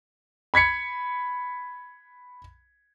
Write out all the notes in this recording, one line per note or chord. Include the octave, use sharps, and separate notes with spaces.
B5 G#6 B6 C#7